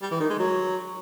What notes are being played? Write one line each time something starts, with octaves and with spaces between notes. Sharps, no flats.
G3
E3
D#3
G#3
F#3